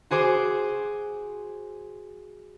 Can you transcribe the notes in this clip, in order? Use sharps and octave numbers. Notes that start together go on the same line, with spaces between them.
F#4 G#4 C5 D6